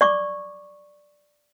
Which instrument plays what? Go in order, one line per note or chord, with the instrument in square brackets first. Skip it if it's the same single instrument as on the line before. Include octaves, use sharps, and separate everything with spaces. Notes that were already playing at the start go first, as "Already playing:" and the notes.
[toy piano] D5 C#6 D6